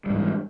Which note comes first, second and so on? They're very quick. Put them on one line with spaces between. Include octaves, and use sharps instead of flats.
G3 G#2 E3